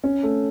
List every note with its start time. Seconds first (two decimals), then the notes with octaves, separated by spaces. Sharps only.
0.04 C#4
0.23 A3